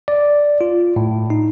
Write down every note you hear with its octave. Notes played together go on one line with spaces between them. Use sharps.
D5
F4
A2
D#4